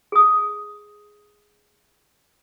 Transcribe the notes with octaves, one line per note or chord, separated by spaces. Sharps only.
G#4 D#6